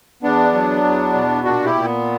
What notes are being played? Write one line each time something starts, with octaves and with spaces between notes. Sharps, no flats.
E2 B3 D4
F#3
E2
B2
A#2 D4 F#4
E4 G4
A#2
B3